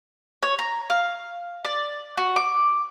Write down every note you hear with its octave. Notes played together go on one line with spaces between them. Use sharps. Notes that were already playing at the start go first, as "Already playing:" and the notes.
C#5
A#5
F5
D5
F#4
D6